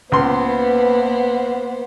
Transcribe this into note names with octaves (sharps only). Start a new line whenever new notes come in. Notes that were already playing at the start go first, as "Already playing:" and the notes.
C#2 A#3 B3 B4 C5 C6